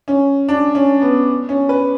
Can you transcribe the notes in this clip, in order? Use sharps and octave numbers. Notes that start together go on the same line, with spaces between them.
C#4
D4
C#4
B3
C#4
B4